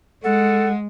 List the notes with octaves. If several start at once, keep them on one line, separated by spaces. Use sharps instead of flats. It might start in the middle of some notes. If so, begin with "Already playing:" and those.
G#3 A4 F#5